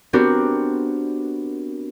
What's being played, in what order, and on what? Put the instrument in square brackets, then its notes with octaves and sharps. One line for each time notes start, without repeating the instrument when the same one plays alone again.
[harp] B3 C4 D4 F#4 G4 A#4